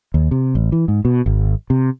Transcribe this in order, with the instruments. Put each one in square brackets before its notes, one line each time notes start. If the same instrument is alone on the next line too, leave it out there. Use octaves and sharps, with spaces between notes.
[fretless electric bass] D#2
C3
A1
E3
G#2
B2
G#1
C3